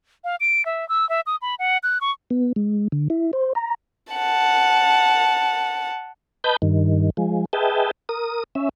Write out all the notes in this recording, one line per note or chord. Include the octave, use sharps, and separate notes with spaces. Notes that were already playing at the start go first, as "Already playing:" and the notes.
F5
D7
E5
E6
E5
D#6
B5
F#5
F#6
C#6
B3
G#3
D3
E4
C5
A#5
F#5 A5
B4 D#5 A5 B5 G6
G2 D#3
F3 G#3
G#4 B4 D#5 E5 G5 A5
A#4 D#6
C#4 E5